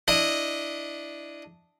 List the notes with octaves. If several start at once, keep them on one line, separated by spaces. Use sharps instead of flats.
D4 E4 D#5